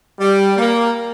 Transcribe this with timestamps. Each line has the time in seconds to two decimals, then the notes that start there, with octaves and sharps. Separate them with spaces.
0.19 G3
0.58 A#3